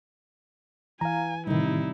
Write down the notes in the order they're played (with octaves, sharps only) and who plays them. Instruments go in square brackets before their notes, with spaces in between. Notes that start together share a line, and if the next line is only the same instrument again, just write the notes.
[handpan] E3 [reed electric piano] F5 A#5 [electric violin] G#5
[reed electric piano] A2 D#3 [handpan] C3 G3 [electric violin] D#4 E4